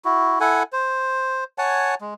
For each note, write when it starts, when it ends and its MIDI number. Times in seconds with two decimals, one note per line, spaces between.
0.05 0.39 64
0.05 0.39 66
0.41 0.63 64
0.41 0.63 69
0.41 0.63 78
0.41 0.63 80
0.73 1.44 72
1.58 1.95 73
1.58 1.95 78
1.58 1.95 80
1.58 1.95 81
2.01 2.14 56